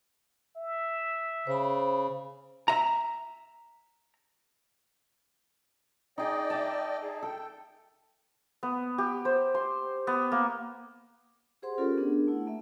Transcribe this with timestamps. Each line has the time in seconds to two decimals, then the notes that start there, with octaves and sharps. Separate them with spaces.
0.56 E5
1.47 C#3 C5 B5
2.68 E5 A#5
6.18 D#4 G#4 D5 D#5 G5
6.50 E5 A5
7.01 D#4 G#4
7.22 A4 G5
8.63 B3
8.98 G4
9.25 C5
9.55 C6
10.07 B3
10.32 A#3
11.62 G4 G#4 C5 F#5 C6
11.78 C#4 F4 G4 A4 A#4 D5
11.98 B3 D4 G#4 A#4
12.28 A3 E4 F#5
12.47 A3 A#3 E5